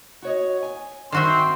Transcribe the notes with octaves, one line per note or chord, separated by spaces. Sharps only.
F#4 C#5 D#5
G#5
D#3 C4 F#4 E5 C6